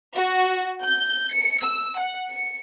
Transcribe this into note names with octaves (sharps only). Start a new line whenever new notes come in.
F#4
G6
C#7
E6
F#5
C#7